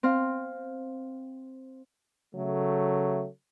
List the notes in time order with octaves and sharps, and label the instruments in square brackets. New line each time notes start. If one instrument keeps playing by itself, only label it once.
[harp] C4 C5 F5
[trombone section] C#3 F#3 A3